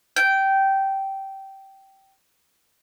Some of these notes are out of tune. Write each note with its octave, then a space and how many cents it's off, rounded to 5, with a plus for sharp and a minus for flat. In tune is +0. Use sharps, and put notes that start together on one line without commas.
G5 -15